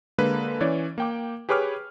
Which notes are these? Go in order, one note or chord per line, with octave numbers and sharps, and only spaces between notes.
D3 G#3 A#3 B4 B5
E3 C#4 C#5 D5
A#3 G5 D6
G4 G#4 B4 C#5 D6 F6